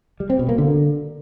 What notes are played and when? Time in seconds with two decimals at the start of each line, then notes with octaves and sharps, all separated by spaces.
0.20 G3
0.30 C4
0.39 B2
0.49 A#3
0.58 D3